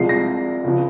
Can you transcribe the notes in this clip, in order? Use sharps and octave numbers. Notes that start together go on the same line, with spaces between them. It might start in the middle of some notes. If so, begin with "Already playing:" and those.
Already playing: C2 C3 F3 G#3 C7
A#6
C#2 C#3 F3